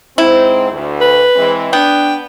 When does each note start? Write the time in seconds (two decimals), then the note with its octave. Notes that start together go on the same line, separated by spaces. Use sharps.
0.18 G#2 C4 E4
0.71 D2
1.01 B4
1.36 E3 G#3 C4
1.73 B3 D4 G5